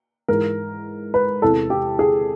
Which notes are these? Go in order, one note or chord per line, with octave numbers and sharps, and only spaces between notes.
G#2 E3 A#4
B4
E2 C3 E3 A4
G4
G#4